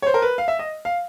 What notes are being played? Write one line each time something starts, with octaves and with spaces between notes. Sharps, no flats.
C#5
C5
A#4
B4
F5
E5
D#5
F5